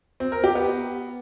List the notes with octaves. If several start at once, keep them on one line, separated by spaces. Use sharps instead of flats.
C4
A#4
G4
B3